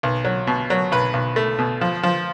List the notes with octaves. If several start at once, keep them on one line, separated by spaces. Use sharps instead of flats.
B1
F#3
B2
F#3
B1 B4
B1
A3
B2
F3
F3